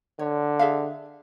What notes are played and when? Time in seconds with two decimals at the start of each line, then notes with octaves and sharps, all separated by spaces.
0.19 D3 C#5
0.59 G#4 E5 F5